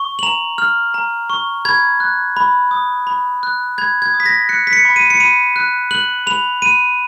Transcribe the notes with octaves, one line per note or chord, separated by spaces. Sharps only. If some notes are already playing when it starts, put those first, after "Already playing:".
Already playing: C#6
F#7
A#5 F7
F6
A#5
C#6
B5 G#6
F#6
B5
D#6
B5
F#6
B5 G#6
G#6
D#6
B6
A#6
F#6 C#7
B6
C#7
B5
D#7
C#7
B5 D#7
F#6
F#6 F#7
B5 F7
B5 D#7